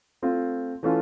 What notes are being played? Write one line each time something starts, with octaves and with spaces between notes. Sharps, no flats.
A3 C4 F4
E3 A3 C#4 F4 A4